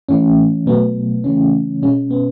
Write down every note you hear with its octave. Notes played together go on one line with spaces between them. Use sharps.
A2 E3 A3 C#4
B2 F#3 A3 B3
C#3 E3 A3 C#4
B2 G#3 C#4
B3